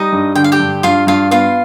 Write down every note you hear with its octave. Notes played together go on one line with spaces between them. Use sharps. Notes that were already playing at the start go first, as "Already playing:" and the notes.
Already playing: G3 D#4 D#5
G2
D3 G5
F5
G4 G5
G2
G2 F4 F5
G2 F4 F5
B3 F4 F5